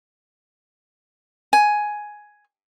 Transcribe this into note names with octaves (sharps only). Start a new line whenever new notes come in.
G#5